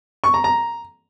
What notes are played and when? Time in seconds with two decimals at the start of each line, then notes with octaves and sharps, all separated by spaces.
0.24 C#6
0.34 A#5
0.44 A#5